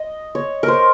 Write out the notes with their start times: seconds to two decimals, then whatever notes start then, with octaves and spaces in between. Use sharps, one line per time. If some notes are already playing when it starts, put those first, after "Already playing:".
Already playing: D#5
0.35 C#5
0.63 A#4
0.68 C5